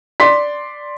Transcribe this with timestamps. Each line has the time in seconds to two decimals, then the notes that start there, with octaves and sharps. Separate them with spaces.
0.20 D5 C6 B6